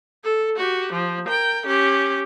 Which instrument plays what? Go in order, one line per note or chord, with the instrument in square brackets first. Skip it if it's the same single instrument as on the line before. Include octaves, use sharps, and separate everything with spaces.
[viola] A4
F#4 G4
F3
A#4 G5
C#4 G4